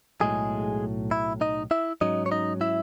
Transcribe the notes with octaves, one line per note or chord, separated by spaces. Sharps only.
B1 A2 F#3 G#3 G#4
E4
D#4 D#5
E4 E5
G#2 F#3 C#4 D#4 D#5
C#5
D#4 D#5
E4 E5